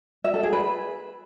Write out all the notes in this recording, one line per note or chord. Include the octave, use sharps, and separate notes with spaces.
E5
A4
G#4
B4